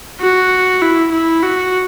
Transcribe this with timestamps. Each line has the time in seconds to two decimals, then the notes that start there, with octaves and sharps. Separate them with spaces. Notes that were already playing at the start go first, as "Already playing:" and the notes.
0.21 F#4
0.82 E4
1.12 E4
1.43 F#4